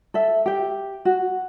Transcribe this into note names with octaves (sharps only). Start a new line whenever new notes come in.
A4 E5
G4 G5
F#4